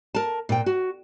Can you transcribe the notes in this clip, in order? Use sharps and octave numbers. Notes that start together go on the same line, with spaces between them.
A#4 A5
A#2 G5
F#4